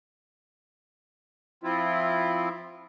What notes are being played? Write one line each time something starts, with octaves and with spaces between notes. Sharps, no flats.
F3 C4 E4 F4